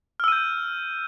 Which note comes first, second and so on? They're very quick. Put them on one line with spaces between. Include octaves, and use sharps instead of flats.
F6 E6 D#7 G6